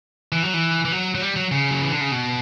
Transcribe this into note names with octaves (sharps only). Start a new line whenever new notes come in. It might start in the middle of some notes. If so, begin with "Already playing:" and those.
E3
F#3
E3
E3
F#3
F#3
G3
F#3
C#3
F#3
E3
D3
C#3
B2